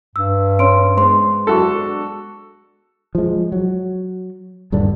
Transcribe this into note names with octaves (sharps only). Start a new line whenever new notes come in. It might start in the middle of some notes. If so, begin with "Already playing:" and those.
G2 E6
C#4 C#5 C6 D7
G#3 B3 C5 C6
D4 F#4 A4
F3 G#3
F#3
D#1 G2 D3 D4